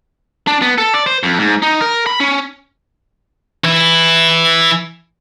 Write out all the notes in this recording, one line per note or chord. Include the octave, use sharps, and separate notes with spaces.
D4
B3
A4
D5
C5
F2
G#2
D#4
A#4
B5
C#4
E3 E4